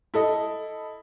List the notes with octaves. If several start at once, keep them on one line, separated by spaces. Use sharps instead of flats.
E4 A4 D#5